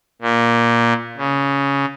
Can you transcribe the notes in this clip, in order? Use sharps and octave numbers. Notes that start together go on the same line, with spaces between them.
A#2
C#3